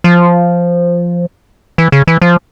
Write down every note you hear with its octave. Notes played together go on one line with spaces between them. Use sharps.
F3
E3
C#3
E3
F3